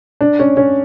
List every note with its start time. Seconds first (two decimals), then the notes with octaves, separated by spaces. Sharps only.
0.21 D4
0.39 C#4
0.57 C#4